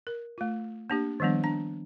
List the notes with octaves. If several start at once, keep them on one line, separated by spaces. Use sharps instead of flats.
A#4
A3 F4
A#3 D4 G4
D#3 F3 G3 B3 D4
D4 A#5